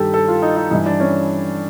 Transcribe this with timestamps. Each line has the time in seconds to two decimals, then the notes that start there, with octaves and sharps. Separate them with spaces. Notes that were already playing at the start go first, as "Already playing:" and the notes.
Already playing: G2 D#3 G4 A4
0.14 A4
0.28 F4
0.42 D#4
0.57 D#4
0.71 G2 E3 D#4
0.86 D4
1.00 C#4